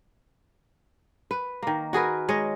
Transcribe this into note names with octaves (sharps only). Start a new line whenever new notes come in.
B4
D#3 A#3
F#4 G#4 A#4 B4
G#3 C#5 D#5